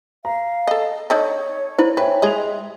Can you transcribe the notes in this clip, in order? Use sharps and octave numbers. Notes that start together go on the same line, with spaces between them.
F5 A#5
A4 D#5
D4 D#4 A4 C#5
E4 B4 C5
B4 C#5 E5 G5 G#5
G#3 G#4 D#5 F7